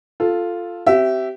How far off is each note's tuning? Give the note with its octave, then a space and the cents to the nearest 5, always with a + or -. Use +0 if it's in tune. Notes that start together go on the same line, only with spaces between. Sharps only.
F4 +0 A4 +0
C4 -5 G4 -30 E5 +0